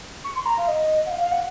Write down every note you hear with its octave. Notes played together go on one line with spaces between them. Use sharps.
C#6
C6
A#5
F5
D#5
F#5
F5
F5
F#5